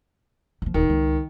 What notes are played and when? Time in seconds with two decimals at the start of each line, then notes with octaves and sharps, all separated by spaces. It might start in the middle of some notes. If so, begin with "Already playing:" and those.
0.62 D#3 F3
0.74 D1 D#3
0.90 C#2